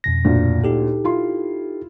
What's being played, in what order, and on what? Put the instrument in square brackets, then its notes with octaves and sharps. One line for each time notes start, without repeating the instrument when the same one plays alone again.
[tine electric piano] F2 B2 A#6
[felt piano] D2 A#2
[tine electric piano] D#4 G4 A4
[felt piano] E4 F4 C6